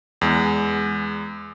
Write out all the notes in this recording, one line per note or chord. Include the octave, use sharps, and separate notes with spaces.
E2 G#3